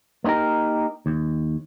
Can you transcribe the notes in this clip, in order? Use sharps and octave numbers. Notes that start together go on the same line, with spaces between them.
A#3 B3 D#4 G4 A#4
D#2